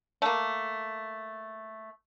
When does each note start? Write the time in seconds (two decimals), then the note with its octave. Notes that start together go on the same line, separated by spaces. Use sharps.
0.22 A3 A#3